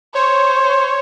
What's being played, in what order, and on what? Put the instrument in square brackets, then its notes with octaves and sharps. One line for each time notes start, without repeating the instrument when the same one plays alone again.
[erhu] C5 [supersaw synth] C#5